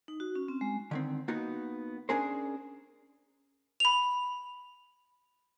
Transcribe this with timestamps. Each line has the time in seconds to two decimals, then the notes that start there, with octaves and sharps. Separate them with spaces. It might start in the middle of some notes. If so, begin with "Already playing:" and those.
0.08 D#4
0.20 F#4
0.35 C#4
0.48 C4
0.61 G#3
0.91 D3 D#3 C4
1.28 A#3 B3 D#4 F#4
2.09 C#4 D4 G#4 A#4 C5
3.80 B5 F7